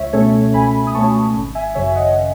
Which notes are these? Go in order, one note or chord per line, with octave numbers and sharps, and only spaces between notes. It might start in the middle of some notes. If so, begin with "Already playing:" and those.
Already playing: C#2 C#5 E5
B2 A3 C#4 A4 C#5
C#2 G#5 B5
D#6
B2 A3 C#4 A5 C#6
G#1
E5 G#5
F#2 C#3 C#5 E5
D#5 F#5